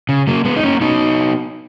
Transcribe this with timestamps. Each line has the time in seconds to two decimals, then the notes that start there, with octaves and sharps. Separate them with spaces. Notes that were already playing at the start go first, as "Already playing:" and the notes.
0.09 C#3
0.27 F#3 A#3
0.45 G#3 B3
0.56 D#4
0.63 A#3 C#4
0.81 B3 D#4